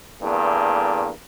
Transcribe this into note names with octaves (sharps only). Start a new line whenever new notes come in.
E2 G2 A3 A#3